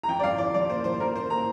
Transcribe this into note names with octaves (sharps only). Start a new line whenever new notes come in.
A#5
F2 G5
D5
F3 F5
F2 D5
F3 D5
A#3 C5
F3 C5
A#3 A#4
A#3 C5
A#3 A#5